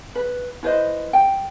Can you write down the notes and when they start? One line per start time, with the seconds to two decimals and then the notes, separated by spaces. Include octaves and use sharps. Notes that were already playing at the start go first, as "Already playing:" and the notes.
0.15 B4
0.63 E4 B4 C5 D#5
1.13 G5